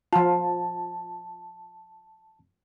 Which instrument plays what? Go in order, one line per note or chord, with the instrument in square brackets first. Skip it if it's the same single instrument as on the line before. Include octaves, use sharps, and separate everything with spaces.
[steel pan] F3 F4 [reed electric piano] A5